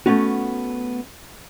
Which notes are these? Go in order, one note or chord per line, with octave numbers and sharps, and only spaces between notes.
A3 B3 C#4 F#4